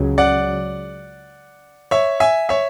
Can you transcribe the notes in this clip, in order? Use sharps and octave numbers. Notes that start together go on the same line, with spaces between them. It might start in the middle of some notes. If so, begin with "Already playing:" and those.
Already playing: C#2 C#3 F#3
D5 F#5
C#5 E5
E5 G#5
C#5 E5